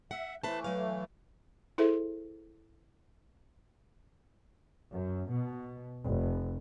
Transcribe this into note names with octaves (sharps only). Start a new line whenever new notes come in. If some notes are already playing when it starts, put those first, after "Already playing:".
E5 F#5
E3 A3 B4 C5 A5
F#3 F5
E4 G#4 A4 C5 E5 C6
F#2
B2
F1